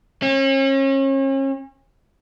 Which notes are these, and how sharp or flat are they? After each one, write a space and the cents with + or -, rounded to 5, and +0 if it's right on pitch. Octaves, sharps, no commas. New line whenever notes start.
C#4 -40